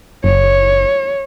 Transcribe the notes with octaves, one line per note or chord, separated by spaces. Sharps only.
F#1 C#5